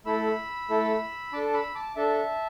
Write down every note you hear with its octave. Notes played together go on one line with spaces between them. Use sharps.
A3 E4 A4 B5 E6
A3 E4 A4
D4 A4 A5 D6
B5 E6
A5 D6
D4 A4 E5 A5